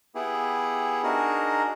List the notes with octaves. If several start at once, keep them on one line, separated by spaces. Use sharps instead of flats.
B3 E4 G4 G#4
D4 D#4 F#4 G#4 A#4 D#5